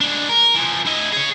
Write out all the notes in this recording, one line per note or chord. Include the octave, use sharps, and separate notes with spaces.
G#3 D4
A#4
E3 F3
E4 D#5
G#4 C#5